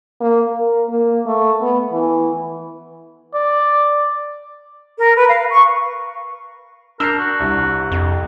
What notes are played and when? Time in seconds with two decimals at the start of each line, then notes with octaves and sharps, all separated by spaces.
0.21 A#3
0.52 A#4
0.89 A#3
1.26 A3
1.61 B3
1.92 E3
3.34 D5
4.97 A#4
5.15 B4
5.28 F5
5.50 C#6
7.00 D4 A#4 E6 G6 C7
7.19 F#4
7.40 C2
7.92 F2